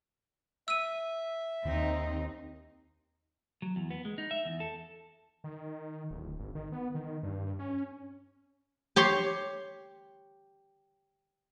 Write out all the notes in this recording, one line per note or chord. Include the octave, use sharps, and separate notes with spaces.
E5 E6 D#7
D#2 C4 D#4
F#3
E2
B3
G#3
D#4
E5
E2
A4
D#3
D1
G#1
D#3
B3
D#3
G2
C#4
G4 C#5 C6